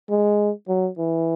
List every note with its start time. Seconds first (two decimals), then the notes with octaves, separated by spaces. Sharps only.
0.10 G#3
0.68 F#3
0.98 E3